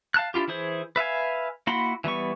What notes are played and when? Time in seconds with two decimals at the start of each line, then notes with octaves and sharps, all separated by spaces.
0.14 F5 A5 F#6
0.34 D4 E4 F4 G4
0.48 E3 E4 G#4 C5
0.96 B4 E5 F5 G#5
1.67 A#3 E4 F#4 B5 C6
2.04 E3 G3 B3 C#6